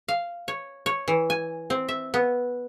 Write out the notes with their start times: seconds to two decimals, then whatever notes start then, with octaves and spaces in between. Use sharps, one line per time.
0.08 F5
0.48 C#5
0.86 C#5
1.08 E3
1.30 G#5
1.70 C4
1.89 E5
2.14 B3